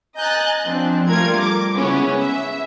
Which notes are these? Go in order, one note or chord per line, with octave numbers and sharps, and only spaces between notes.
D#5 G#5 A#5 F#6 G6 A6
F3 C4 D4
G3 A3 F4 A#4 G#6
D6
C#3 G#3 B3 C#4 E4
E5